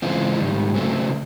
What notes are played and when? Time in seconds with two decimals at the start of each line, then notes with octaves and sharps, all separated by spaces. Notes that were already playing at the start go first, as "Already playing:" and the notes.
0.02 C#3 E3 G#3 C4 F4
0.39 G#2 D#3 G3
0.74 C#3 F#3 A3 C4